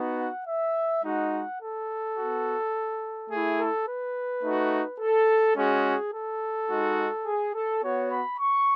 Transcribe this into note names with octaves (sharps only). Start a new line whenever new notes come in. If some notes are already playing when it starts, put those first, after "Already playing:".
Already playing: B3 D#4 F#4
F#5
E5
G#3 D#4 F#4 F#5
A4
B3 F#4
A3 E4 G#4
A4
B4
A3 D#4 F#4
A4
G#3 C#4 F#4 G#4
A4
G#3 D#4 F#4
G#4
A4
B3 F#4 C#5
B5
C#6